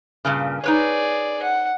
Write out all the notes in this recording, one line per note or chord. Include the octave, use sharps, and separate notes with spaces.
G2 A#2 C#3
D#4 G#4 B4 C#5 D5
F#5